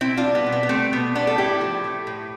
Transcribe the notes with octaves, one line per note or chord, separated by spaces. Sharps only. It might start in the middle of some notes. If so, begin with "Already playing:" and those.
B2 C4 E4
D4 F4
G3
B3
B2
B3
B3
G3 A3 C4
B2 B3
G3 B3 D4
A4
A2 E4 G4
F3
A3
A2